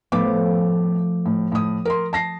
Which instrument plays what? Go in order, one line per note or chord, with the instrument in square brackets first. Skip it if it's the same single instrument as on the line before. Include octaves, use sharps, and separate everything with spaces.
[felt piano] A2 B3 D6 [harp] F3 A3
[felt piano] A2
A2 D#6
A#4 C6
A5 A#6 C7